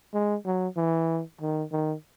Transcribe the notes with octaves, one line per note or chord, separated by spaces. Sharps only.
G#3
F#3
E3
D#3
D#3